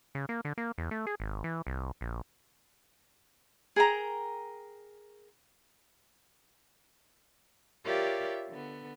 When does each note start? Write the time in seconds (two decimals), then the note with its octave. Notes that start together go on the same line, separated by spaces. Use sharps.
0.15 C#3
0.29 A#3
0.45 D3
0.58 A#3
0.78 E2
0.91 A3
1.07 G#4
1.20 G#1
1.44 E3
1.67 C2
2.01 A#1
3.76 G#4 A#4 G5 A#5
7.85 F4 G4 A#4 C#5 D5 E5
8.50 D3 B3